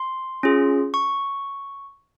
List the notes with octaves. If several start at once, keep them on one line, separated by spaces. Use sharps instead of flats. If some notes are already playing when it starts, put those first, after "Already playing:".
Already playing: C6
C#4 F4 G#4
C#6